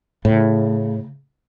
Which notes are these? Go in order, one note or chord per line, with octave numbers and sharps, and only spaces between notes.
A2 C#3